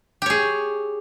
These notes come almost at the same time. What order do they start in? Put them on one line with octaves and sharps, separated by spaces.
G4 C#5 G#4